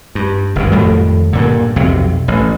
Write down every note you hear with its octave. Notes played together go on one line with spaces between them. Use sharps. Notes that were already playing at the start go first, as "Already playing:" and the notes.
G2
G1 F#2 D#3
F2 A2 D#3 G3
G2 A#2 D3
B1 F2 C3
A1